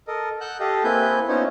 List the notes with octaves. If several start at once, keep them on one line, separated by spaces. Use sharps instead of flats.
A4 A#4 D#5
F#5 E6 F#6 G6
G4 A4 D#5 F5
A#3 C4 E4 B4 G#5 G6
B3 C#4 D#4 F4 C5 C#5